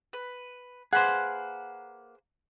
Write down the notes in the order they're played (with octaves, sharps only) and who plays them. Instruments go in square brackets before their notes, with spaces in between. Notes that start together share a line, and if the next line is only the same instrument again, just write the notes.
[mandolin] B4
[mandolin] A#3 F#5 [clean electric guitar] G#4 B4 C5